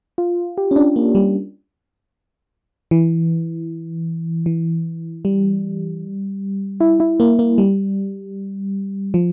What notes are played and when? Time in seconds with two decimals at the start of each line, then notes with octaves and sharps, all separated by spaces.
0.18 F4
0.58 G4
0.71 C#4
0.76 D4
0.96 A#3
1.15 G3
2.91 E3
4.46 E3
5.25 G3
6.81 E4
7.00 E4
7.20 A#3
7.39 A#3
7.58 G3
9.14 F3